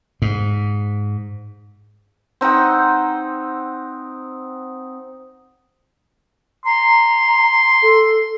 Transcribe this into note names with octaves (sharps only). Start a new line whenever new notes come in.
G#2
C4 D#4 F#5 G5
A#5 C6
A4